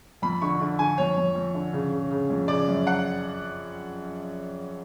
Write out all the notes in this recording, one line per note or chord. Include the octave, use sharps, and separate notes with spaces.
F2 B5
D3 C#6
D3
D3 G#5
F2 C#5
F2
F2
D3
C#3
C#3
C#3
F2
C#3 D5
F#2
F#5